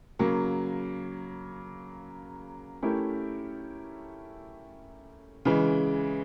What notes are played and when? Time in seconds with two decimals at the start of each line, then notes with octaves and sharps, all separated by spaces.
0.19 C#3 F#3 A#3
2.83 A3 C#4 E4 G4 A#4
5.45 C#3 E3 G#3